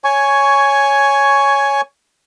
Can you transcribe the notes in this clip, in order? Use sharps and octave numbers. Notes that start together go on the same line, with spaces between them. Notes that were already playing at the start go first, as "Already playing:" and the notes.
C#5 G#5 C#6